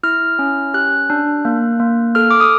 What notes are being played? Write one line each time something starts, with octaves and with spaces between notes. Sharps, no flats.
E4 F6
C#4
G4 F#6
D4
A#3
A#3
A4 F6
D6
D#6